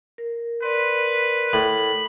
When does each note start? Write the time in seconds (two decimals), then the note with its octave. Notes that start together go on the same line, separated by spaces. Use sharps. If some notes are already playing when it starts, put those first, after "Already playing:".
0.18 A#4
0.62 A#4 B4 D5 C6
1.53 A2 B5